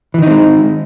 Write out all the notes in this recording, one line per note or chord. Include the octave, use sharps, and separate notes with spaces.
D#3 E3 G#3 C4 D#4